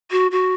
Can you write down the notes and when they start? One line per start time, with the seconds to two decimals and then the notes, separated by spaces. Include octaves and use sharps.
0.11 F#4
0.31 F#4